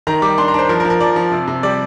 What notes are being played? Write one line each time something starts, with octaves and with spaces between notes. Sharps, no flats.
D#3 A#5
G3 D6
D4 C6
A#5
D4 C5
F3 A#4
A#4
F3
A#4
F3 D5
F3
C3
C3
G3 D5